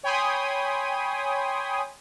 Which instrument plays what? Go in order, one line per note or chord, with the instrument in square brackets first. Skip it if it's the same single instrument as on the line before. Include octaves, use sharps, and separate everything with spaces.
[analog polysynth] C#5 G5 G#5 B5 C6 D#6